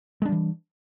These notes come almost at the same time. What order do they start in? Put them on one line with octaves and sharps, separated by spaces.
G#3 D4 G3 E3